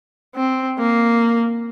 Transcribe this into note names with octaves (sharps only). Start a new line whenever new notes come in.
C4
A#3